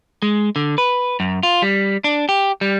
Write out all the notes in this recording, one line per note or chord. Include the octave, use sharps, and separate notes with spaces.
G#3
D3
B4
F#2
F4
G3
D4
G4
G3